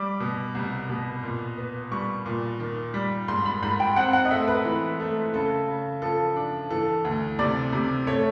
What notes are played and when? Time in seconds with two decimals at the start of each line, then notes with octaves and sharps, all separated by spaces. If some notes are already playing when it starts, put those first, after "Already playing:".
Already playing: G3 D6
0.20 B2
0.55 C2
0.89 B2
1.23 A#2
1.57 B3
1.91 G3 C#6
2.26 A#2
2.60 D#3
2.94 G3
3.28 G#2 C6
3.45 B5
3.62 G#2 B5
3.80 G5
3.96 C4 F#5
4.13 F#5
4.25 D#5
4.31 A3 E5
4.48 B4
4.65 E3
5.00 A3
5.34 C#3 A4
5.68 C#3
6.02 F3 A4
6.36 D4
6.70 E3 A4
7.05 D2
7.39 C3 D5
7.73 C3
8.07 A3 C#5